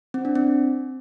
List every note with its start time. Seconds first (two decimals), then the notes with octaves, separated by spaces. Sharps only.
0.14 C4
0.25 D4
0.35 C4